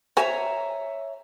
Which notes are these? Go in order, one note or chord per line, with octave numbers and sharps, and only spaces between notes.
F#4 C5 C#5 E5 G#5 A#5